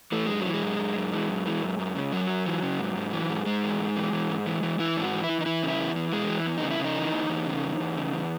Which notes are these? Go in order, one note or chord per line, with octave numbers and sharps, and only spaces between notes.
E3 A3
F#2 G#3
F#3
E3
G#3
F#2
F#2
F#2
E3
F#2
E3
F#2
F#2
C#3
F#2 F#3
F#2
E3
C#3
G#2
G#2
E3
G#2
G#2 G#3
E3
G#2
E3
E3
G#2
E3
E3
E3 E4
G#2
F#4
E3
E4
E3
D#4
E3 E4
C#3
E4
E2
E3
E2 G#3
E3
E2
D#4
C#3
E4
C#3 D#4
E3
E2
E2
C#3
E2
E2
C#3
E2